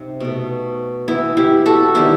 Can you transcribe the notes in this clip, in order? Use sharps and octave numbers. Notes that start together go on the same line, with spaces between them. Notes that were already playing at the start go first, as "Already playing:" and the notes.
Already playing: C3 D#4
B2 A3
E3 B3 E4
E4 G4
F#4 A4
D#3 G3 B3 E4 G4